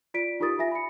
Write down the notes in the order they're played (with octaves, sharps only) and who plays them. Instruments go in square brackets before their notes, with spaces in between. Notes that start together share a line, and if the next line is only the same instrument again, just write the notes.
[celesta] F4 D5 B6 D7
D#4 F4 G4 A#4 D#6 A6
F4 E5 G#5 A#6
B5 C#7